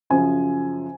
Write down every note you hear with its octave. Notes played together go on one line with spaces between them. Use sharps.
F#2 C#3 F3 G#5